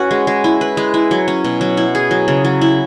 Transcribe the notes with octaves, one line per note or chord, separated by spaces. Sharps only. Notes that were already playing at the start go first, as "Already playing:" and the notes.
Already playing: C#4 F#4 B4
G#3
G#3
E4
B4
G#3
E4
F#3
C#4
B2
F#3
E4
G#4
F#3
C#3
F#3
E4